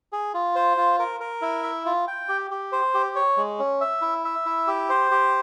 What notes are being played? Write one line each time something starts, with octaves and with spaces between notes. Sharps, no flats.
G#4
F4
C5
F4
A#4
A#4
E4
E5
F4
G5
G4
G4
C5
G4
C#5
G#3
C#4
E5
E4
E5
E4
G4
C5
G4